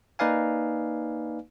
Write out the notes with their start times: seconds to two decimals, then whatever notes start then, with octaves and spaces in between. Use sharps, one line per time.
0.19 A#3 D#4 B4 D5 F5 G#5